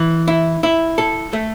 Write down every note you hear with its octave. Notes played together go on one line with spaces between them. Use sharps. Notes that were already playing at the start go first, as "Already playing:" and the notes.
Already playing: E3
E4
E4
A4
A3